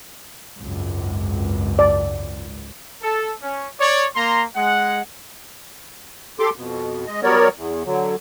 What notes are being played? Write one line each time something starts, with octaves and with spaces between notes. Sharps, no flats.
G#1 C#2 F#2
D5
A4
C#4
C#5 D5
A#3 A#5 C6
G#3 F#5
G4 A4 C6 D6
F2 B2
G#3 D#5
F#3 G3 B3 A#4 C#5 D5
E2
D3 F#3